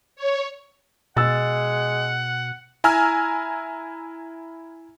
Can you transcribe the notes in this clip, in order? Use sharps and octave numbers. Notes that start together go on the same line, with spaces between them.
C#5
B2 G#3 F#5 E6 A6
E4 G#5 A#5 E6 F6